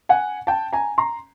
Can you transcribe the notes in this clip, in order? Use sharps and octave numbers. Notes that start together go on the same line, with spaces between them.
F#5 G#5
G5 A5
G#5 A#5
A#5 C6